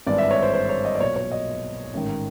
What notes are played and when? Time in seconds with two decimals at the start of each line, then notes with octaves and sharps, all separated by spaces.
0.07 G#1 G2 E3 G#3 D5
0.18 E5
0.31 C#5
0.42 C5
0.54 C5
0.69 C#5
0.85 D#5
0.95 D5
1.00 B1 A#2 F#3 C#5
1.16 C#5
1.32 D#5
1.93 A1 G#2 D#3